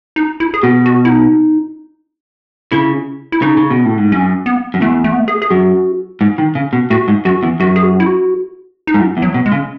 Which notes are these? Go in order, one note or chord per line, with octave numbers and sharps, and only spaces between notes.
D#4
E4
G#4
B2 F#4
F#4
E4
D#4
C#3 E4
E4
C#3 D#4
C#3
B2
A2
G#2
F#2 C#4
B3
F#2
E2 A3
A3
B3
A3
G#4
G#4
F#2 F#4
G#2
D#3
C#3
B2
A2 F#4
G#2
F#2 F#4
E2
F#2 F#4
G#4
F#4
E4
F#4
D#4
G#2
F#2 E4
E2
F#3
B2
G#3
C#3